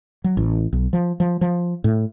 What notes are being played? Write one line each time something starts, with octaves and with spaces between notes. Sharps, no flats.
F#3
A1
B1
F3
F3
F3
A2